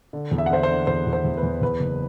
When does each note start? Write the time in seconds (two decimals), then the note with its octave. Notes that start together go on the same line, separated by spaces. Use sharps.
0.13 D3
0.31 E2
0.38 E5
0.46 F#5
0.50 D3 C5 E5
0.63 C5
0.70 D3
0.87 E2 C5
1.07 E2
1.13 C5
1.25 E2
1.38 B4
1.43 E2
1.62 E2 B4
1.80 F#1